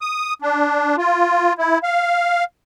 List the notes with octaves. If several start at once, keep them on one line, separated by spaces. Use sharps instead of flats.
D#6
D4
F4
E4
F5